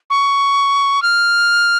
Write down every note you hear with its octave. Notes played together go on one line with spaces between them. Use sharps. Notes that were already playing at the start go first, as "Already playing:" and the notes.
C#6
F6